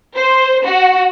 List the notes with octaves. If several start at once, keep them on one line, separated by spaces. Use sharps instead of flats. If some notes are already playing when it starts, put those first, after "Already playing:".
C5
F#4